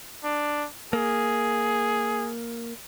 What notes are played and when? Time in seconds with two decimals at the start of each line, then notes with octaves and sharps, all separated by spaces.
0.24 D4
0.93 A#3 G#4